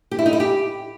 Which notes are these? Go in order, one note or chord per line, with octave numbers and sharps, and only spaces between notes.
G4
E4
D#4
E4
G4